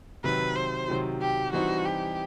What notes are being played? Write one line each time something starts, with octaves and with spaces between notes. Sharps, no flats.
C3 D#3 F#3 B4
C5
C3 D#3 F#3
G4
E3 G3 C4 D#4 F#4
G4